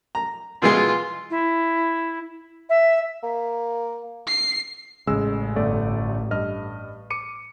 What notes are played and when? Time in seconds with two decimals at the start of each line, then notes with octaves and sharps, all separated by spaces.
0.15 A#5
0.62 B2 E3 G#3 F4
1.30 E4
2.69 E5
3.23 A#3
4.27 C7
5.07 A1 C#3 G#3 E6
5.56 G1 A3 D5
6.31 G2 D#5 F6
7.10 D6 C#7 D#7